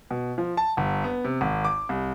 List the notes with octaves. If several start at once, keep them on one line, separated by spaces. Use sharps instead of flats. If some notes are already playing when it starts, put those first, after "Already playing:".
B2
F3
A5
G1
B3
C3
G#1
D6
C2